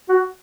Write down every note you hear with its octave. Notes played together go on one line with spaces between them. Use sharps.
F#4